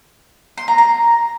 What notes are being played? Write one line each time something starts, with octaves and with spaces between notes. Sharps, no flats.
C6
A#5
A#5